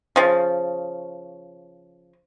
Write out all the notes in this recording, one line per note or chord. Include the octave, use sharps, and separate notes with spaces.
C#3 F3